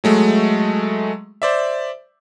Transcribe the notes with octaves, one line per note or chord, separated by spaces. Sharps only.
F#3 G#3 A3
C5 D5 E5